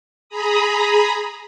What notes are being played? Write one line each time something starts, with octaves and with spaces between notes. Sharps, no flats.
G#4 A#5 B5 D#6